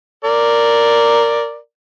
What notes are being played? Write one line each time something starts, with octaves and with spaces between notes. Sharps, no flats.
A#4 D5